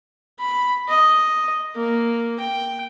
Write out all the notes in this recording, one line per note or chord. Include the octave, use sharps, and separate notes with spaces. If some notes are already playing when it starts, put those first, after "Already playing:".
B5
D#5
A#3
G5